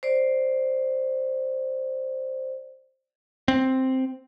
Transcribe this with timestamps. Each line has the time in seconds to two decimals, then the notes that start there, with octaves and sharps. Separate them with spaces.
0.03 C5 D5
3.48 C4